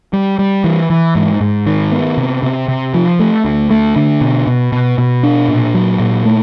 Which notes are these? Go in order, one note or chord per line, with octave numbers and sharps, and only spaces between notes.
G3
G3
E3
E3
G#2
G#2
D#3
B3
C3
C3
C3
F3
A3
D2
A3
D3
B2
B2
B2
B2
D4
A#2
F#3
A#2
A3